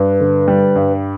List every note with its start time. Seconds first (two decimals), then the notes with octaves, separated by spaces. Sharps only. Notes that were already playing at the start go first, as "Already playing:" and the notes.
Already playing: G2 B4
0.21 D3
0.48 G3
0.76 G2